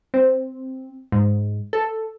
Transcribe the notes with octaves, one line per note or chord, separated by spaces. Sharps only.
C4
G#2
A4